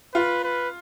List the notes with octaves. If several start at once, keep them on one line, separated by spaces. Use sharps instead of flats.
F4 B4
B4